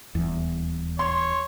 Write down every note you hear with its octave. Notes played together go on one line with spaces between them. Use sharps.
D#1 E2
C#5 C6